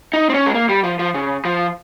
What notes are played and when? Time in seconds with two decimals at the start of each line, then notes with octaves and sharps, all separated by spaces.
0.13 D#4
0.30 C4
0.34 C#4
0.46 G#3
0.55 A#3
0.69 G3
0.84 F3
0.99 F3
1.14 C#3
1.45 F3